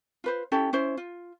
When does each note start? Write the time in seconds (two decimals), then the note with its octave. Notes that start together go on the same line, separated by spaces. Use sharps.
0.24 F4 B4 C5
0.52 C#4 E4 G4 A4
0.73 C#4 E4 C5
0.97 F4